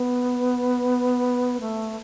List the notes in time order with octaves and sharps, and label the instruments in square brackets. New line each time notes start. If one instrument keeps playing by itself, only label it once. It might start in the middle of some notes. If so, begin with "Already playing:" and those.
Already playing: [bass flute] B3
A3